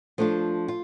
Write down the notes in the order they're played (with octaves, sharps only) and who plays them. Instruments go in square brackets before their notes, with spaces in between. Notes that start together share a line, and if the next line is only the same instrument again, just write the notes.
[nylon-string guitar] F3 A3 D4 F4
F4